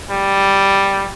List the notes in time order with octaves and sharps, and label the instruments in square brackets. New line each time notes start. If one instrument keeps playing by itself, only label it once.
[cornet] G3